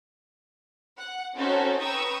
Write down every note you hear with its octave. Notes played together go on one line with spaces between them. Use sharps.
F#5
C4 C#4 D#4 F#4 A4 C5
B4 G5 A#5 C#6 D#6 E6